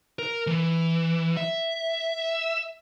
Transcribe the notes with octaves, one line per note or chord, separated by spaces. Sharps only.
A#4
E3
E5